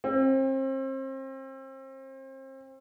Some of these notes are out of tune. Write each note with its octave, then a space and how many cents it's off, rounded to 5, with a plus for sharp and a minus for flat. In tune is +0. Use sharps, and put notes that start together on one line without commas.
C4 +35